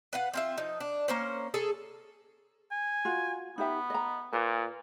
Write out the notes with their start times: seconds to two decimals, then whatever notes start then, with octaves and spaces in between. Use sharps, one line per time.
0.13 B4 F5 F#5
0.34 C4 F4 E5
0.58 F3 D#4
0.80 D4
1.08 A#3 C#4 C5
1.54 G#4 A4 A5
2.71 G#5
3.05 F4 F#4
3.58 B3 D#4 G4 E5
3.90 D#5 A#5
4.33 A#2 B4